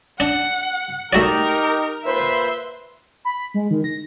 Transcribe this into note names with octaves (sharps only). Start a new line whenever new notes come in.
D4 F#5
A3 D#4 F#4 G4 A#4 D5
A#2 B4 C5 E5 C6
B5
G#3
D#3
A#6